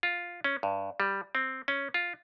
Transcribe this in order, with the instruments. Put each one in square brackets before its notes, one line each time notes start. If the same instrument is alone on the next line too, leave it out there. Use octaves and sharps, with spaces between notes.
[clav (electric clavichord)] F4
C#4
G2
G3
C4
C#4
F4